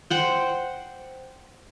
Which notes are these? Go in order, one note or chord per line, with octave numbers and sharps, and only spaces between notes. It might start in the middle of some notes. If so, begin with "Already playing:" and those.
C5 F#5 G5